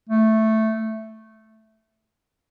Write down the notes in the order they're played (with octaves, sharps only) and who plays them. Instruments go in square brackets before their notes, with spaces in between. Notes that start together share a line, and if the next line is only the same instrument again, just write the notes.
[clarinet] A3